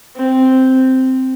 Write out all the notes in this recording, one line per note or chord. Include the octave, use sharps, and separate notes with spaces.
C4